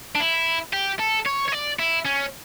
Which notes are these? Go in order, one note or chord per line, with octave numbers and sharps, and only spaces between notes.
D4
E4
G4
A4
C#5
C#5
D5
E4
C#4